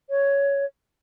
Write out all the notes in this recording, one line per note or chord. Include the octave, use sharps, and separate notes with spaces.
C#5